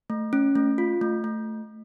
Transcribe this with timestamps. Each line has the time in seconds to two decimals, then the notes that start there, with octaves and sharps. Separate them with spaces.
0.10 A3
0.33 C#4
0.56 A3
0.78 F4
1.01 A3
1.24 A3